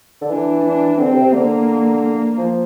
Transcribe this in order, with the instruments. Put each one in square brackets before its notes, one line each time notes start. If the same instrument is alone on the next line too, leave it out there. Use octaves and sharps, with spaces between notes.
[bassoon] D3
[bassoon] E3 [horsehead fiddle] D4
[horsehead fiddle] D4
[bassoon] D3 [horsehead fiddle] C4
[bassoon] C3
C3
[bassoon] D3 [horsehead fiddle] A#3
[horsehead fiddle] A#3
[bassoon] F3